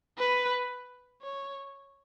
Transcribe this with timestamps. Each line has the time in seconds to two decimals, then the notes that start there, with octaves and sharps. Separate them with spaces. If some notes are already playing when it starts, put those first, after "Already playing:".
0.18 B4
1.22 C#5